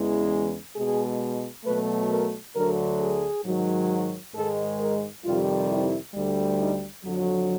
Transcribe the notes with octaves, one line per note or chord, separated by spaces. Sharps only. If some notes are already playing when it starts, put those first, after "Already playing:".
Already playing: E2 C#3 E3 G#3
B2 G#3 G#4
B2 F#3 A3 B4
A#4
D2 D3 F#3 A#4
G#4
G#2 D#3 F#3
G#2 D#3 G#3 A4
A#4
F2 C3 D#3 G3 F4
E4
D2 D3 G3
D#4
F2 D3 F#3